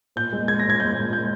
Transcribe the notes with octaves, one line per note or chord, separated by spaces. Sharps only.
A#2 G6
G#3
G#3 G#6
A#6
A#2
G#6
G#3 G6
A#2
G#3 G6